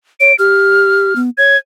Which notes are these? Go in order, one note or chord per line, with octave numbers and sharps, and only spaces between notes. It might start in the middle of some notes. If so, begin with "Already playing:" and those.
C#5 D7
G4 F6
B3
C#5 G#6